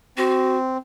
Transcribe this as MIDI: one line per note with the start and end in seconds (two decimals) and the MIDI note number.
0.18 0.77 60
0.18 0.57 66